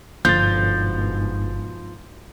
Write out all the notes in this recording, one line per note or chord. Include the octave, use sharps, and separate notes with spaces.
G1 G#2 B2 F3 G6 A6